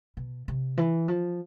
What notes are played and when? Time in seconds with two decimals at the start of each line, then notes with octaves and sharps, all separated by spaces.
0.17 B2
0.48 C3
0.78 E3
1.08 F3